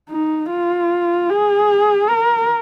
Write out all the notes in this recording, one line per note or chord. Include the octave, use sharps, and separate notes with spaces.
D#4
F4
G#4
A#4